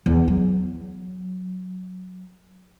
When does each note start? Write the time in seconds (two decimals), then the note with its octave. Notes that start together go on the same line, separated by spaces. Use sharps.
0.06 E2
0.28 F#3